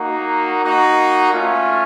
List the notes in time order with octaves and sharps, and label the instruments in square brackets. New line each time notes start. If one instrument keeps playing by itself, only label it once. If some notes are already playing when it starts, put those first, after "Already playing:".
Already playing: [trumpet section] A#3 D#4 F#4
A#3 D#4 F#4
A3 C#4 F4